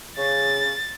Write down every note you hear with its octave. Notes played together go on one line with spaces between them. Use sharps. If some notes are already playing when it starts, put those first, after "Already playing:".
C#3 A6